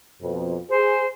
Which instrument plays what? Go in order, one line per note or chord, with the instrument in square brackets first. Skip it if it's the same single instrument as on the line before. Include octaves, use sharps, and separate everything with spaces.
[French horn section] F2 B2
[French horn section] G#4 [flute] C5